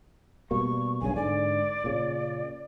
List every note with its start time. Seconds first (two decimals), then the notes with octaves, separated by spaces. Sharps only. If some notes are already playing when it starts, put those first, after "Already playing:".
0.51 B2 G3 A#3 C#6
1.01 B1 G2 C#3 G#5
1.16 G#2 D3 D5
1.84 A#2 C#3